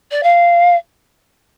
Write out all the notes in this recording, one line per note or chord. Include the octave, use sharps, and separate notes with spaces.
D5
F5